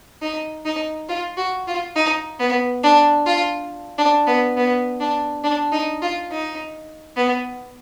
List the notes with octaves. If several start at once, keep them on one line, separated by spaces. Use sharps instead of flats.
D#4
D#4
F4
F#4
F4
D#4
B3
D4
F4
D4
B3
B3
D4
D4
D#4
F4
D#4
B3